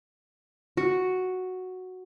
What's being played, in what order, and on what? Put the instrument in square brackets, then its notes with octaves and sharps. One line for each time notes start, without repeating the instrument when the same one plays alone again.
[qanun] F#4